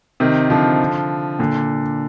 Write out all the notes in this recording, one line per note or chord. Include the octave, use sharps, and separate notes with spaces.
C3 D#3
D3 F3
A#2 D3